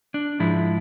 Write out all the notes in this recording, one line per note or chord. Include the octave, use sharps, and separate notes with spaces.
D4
G#2 F3 G#3 E4